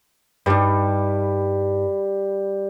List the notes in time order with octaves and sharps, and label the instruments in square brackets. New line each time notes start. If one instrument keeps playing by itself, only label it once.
[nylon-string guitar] G2 D#4 [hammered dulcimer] G3